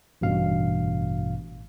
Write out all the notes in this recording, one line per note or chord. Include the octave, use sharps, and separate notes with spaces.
A1 G2 B2 F5